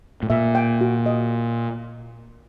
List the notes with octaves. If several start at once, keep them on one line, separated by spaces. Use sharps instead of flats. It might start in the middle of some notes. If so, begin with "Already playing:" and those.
A2
A#2 E5
G5
F#4
D#5